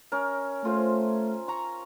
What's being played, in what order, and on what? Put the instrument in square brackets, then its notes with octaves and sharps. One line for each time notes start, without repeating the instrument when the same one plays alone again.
[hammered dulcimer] C#4 A#4
[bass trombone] A3 [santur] F4 C5
[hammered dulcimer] A#5 C#6